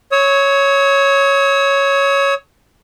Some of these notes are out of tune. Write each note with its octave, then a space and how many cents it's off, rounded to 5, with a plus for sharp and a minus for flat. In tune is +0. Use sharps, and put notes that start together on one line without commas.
C#5 +0 E6 -45